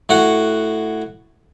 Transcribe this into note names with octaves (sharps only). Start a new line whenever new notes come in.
A2 F#4 F#5